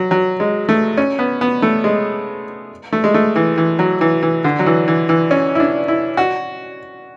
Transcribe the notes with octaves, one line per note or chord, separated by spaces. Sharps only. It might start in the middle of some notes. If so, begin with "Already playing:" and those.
Already playing: F#3
F#3
G#3
A3
C#4
B3
B3
A3
G#3
A3
G#3
A3
E3
E3
F#3
E3
E3
D3
F#3
E3
E3
E3
C#4
E4
D4
E4
F#4